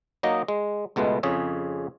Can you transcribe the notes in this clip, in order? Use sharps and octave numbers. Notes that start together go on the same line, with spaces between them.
F#3 A#3 D#4 D#5
G#3
C#2 B2 G#3 A3 B3
F2 C#3 G#4 C#5